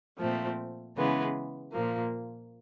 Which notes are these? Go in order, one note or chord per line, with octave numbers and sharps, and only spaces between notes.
A#2 F3 A3 C4
C#3 E3 G#3 B3
A#2 F3 A#3